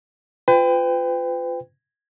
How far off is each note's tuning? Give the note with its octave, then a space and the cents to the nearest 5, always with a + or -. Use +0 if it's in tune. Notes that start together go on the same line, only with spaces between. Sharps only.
F4 +0 B4 +40 G5 +20